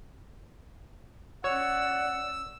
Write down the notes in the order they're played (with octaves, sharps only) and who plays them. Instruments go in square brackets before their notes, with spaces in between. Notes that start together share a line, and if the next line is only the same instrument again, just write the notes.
[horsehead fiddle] C#4 D5 [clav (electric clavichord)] C#5 [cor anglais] F#5 [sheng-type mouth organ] E6